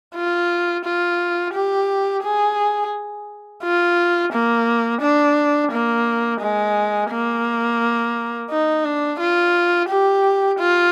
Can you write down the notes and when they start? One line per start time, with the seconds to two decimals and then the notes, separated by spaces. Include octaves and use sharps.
0.15 F4
0.85 F4
1.54 G4
2.24 G#4
3.63 F4
4.32 A#3
5.02 D4
5.72 A#3
6.41 G#3
7.11 A#3
8.50 D#4
8.84 D4
9.20 F4
9.89 G4
10.59 F4